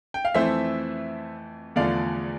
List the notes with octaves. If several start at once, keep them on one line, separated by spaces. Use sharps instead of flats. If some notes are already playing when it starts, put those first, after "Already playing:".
G5
F5
F2 E3 A3 C5 E5
E2 D3 F3 A3 D5 F5